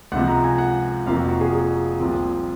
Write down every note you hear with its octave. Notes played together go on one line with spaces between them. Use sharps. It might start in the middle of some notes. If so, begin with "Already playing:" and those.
C#2 C3 F3 F#5
A#5
G#5
F#5
F1 F2 C3 F3 A#3 F5
F#4
F#4
G#4
C2 A#2 F3 C4